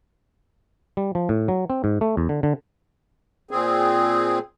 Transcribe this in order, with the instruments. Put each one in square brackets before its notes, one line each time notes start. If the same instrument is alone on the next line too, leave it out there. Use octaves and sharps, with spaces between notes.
[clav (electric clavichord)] G3
F3
A2
F#3
C4
G#2
A3
E2
D3
D3
[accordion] A#2 C4 G#4